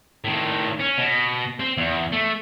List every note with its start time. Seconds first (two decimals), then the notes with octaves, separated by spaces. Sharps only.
0.24 A2 D#3
0.79 C#4
0.98 B2
1.60 C4
1.77 E2
2.12 A3